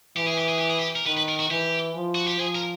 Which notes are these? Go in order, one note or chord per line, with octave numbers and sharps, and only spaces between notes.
E3 G4
G#4
G4
G#4
G4
G#4
G4
A#4
D#3 B4
B4
A#4
F#4
E3 G4
F3
F#4
G4
F3 G#4
A#4